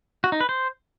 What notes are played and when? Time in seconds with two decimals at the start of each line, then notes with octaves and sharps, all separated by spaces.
0.24 F#4
0.32 D#4
0.41 B4
0.49 C5